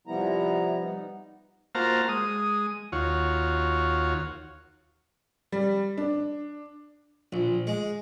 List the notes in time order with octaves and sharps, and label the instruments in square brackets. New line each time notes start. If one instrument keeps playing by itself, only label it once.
[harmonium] C3 F3 G3 B3 E4 A#5
G3 B3 D#4
[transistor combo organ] A#3 F4 F#4 C5 A5 A#5
G#3 D#6
D#2 F4 F#4 C#5
[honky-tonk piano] G3
D4
[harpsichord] A#1
G#3